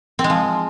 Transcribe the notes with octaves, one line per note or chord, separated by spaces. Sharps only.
C4
G#3
F3